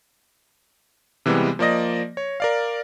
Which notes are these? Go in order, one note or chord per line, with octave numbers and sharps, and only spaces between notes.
C3 E3 G3 G#3 B3
F3 A#3 D5 D#5 A#6
C#5
A#4 D5 F5